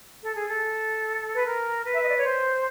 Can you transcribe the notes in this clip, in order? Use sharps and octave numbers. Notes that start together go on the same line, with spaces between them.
A4
G#4
A4
B4
A#4
B4
E5
D#5
D5
C#5
C5